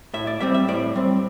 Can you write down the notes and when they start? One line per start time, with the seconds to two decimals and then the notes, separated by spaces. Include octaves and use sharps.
0.14 A2 E5
0.27 D5
0.41 G3 C4 E5
0.54 E5
0.68 A2 D5
0.96 G3 C4